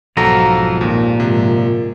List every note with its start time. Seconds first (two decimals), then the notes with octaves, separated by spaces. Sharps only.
0.17 B1 F2 G#2 F3 F#4 A4 A#5
0.81 D#2 A#2
1.20 G#2 C3